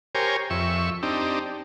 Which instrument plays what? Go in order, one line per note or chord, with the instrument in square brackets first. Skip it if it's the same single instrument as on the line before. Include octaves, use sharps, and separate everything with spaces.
[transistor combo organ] G4 A#4 C5 C#5 G#5
F2 E5 C#6
C4 D4 D#4 G4